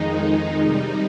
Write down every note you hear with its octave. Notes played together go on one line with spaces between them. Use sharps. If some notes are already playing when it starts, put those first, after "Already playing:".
Already playing: F2 D#3 G#3 D#4
D#4
C3 G3 D#4